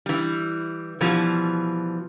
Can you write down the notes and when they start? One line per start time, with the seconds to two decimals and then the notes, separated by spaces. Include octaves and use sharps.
0.06 E3 G3
1.01 B2 E3 F3 G3